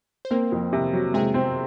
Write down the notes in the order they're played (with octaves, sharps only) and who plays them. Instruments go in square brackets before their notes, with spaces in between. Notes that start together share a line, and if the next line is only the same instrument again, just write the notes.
[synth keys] C5
[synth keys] A#3 A#4 [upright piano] C4
[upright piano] F2
C3
F#3
[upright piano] C3 [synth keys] G#3 G#4
[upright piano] C4